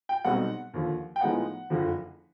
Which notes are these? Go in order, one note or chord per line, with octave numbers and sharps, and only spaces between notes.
G5
B1 B2 G3 C4 D#4 F#5
D#2 D3 F3
G5
A2 F3 G#3 B3 D#4 F#5
F#1 F2 D3 F3